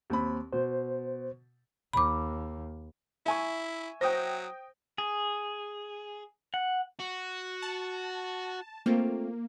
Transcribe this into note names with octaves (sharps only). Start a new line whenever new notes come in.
D#2 C4 B5
B2 C5
D#2 B5 D6
E4 E5 G#5 C#6
F#3 C5 G5 D#6 A#6
G#4
F#5
F#4
A5
A3 A#3 C4 F4